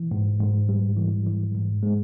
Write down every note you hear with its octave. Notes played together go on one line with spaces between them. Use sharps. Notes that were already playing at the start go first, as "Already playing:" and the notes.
Already playing: E3
G#2
G#2
G3
E3
E3
G#2
G#3